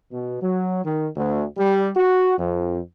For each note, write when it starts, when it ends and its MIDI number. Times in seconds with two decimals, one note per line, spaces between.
0.11 0.40 47
0.42 0.84 54
0.85 1.07 51
1.16 1.45 38
1.57 1.88 55
1.96 2.37 66
2.37 2.79 41